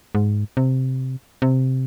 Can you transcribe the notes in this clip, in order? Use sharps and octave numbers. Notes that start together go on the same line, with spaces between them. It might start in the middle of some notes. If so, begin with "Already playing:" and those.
G#2
C3
C3